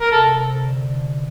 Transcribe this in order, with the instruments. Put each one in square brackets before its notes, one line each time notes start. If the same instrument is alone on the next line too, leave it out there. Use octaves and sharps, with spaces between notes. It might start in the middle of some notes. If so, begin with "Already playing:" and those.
[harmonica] A#4
[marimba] C3 [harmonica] A4
[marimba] C3
D3
D3